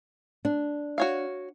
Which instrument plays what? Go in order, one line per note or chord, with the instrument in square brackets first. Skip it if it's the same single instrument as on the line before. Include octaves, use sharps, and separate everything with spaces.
[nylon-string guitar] D4
[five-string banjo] F#4 C#5 F5